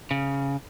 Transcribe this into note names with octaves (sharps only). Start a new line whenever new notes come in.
C#3